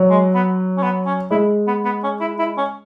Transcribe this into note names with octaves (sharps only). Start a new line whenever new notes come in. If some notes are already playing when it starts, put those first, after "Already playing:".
Already playing: F#3
G#3
B3
C#4
B3
C#4
G#3 E4
B3
B3
C#4
E4
E4
C#4